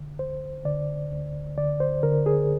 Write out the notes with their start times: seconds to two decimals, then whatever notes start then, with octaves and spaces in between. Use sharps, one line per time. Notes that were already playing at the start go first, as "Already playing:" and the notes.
Already playing: D3
0.19 D2 C5
0.65 D3 D5
1.11 D2
1.57 D3 D5
1.80 C5
2.03 D3 A#4
2.26 G#4